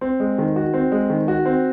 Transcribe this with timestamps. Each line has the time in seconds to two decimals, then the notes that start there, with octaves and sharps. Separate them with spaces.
0.01 C4
0.20 G#3
0.38 D#3
0.56 F#4
0.74 C4
0.92 G#3
1.10 D#3
1.28 F#4
1.46 C4